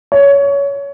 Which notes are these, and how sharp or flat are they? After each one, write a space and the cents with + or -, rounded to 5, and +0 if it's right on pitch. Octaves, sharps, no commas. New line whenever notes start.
C#5 +20